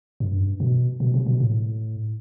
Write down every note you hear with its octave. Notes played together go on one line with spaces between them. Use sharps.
G2
F#2
G2
B2
B2
C3
B2
A2